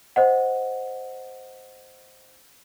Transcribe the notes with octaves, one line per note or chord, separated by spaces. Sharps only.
C5 D#5 F#5